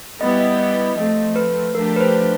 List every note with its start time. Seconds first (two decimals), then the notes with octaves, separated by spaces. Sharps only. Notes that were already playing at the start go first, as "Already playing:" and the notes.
0.21 G3 B3 E4 G4 D#5
0.40 D#5
0.59 D#5
0.97 F3 A3 C4 D#5
1.36 B4
1.74 F3 A3 D4 G4 A#4
1.96 B4
2.01 C5